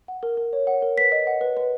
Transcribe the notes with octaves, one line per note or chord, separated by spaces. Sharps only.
F#5
A#4
A#4
C#5
F#5
A#4
B4 B6
D#5
F#5
B4
B4